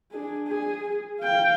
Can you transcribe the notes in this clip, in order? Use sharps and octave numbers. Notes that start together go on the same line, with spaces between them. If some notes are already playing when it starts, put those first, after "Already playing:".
D4 G#4
G#4
F5 G5